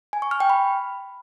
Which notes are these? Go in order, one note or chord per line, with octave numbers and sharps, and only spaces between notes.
G#5
C#6
F6
G5
B5